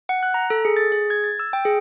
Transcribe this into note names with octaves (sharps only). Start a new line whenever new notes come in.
F#5
F#6
A#5
A4
G#4
A6
G#4
G#6
A6
E6
G5
G#4